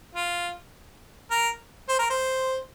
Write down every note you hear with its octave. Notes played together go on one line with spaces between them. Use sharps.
F4
A#4
C5
A#4
C5